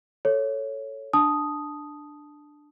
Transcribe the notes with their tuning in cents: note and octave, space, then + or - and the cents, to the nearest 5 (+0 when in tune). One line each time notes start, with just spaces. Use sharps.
A4 +0 C#5 +0
D4 +10 A5 -10 D#6 +0